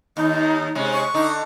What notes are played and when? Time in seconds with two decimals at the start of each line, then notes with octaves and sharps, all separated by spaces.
0.17 D#2 D#4
0.75 C3 G#3 C#4
0.93 C#6
1.14 D3 D#4